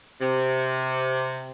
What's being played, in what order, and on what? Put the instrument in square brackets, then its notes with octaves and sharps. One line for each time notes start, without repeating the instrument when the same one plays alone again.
[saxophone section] C3